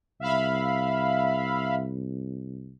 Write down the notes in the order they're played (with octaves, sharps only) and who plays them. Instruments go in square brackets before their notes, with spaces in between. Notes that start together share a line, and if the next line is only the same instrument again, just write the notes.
[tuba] C2 [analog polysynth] E5 F5 B5